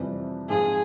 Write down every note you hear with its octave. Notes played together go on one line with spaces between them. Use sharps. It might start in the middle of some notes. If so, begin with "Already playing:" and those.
Already playing: F2 C3 E3 G3
G#2 F3 C4 F4 G#4